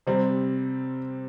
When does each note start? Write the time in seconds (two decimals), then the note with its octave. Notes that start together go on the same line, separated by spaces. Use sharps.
0.07 C3 G3 C4